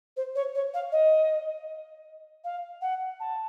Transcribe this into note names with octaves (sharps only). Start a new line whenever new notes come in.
C5
C#5
C#5
F5
D#5
F5
F#5
A5